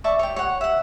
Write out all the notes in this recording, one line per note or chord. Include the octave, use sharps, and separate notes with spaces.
D5 E5 A5 C#6
C#5 G5
C#5 F#5
E5 F#5